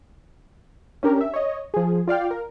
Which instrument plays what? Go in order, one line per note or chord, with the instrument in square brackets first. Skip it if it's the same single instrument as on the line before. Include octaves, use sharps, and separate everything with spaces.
[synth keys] C#4 D4 G4 A#4
E5
C#5 D#5
F3 G#4
F4 D5 F5 G5
A#4